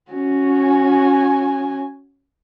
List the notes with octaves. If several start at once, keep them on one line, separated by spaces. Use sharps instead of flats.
C#4 F#4
G#5